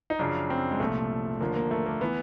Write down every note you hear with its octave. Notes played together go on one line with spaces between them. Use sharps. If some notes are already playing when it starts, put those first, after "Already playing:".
D#4
F#2 C#3 F3 D4
C4
G#3
C2 A#2 F3 A3
D#2 D3 F3 A#3
A#3
A3
A#3
E3 B3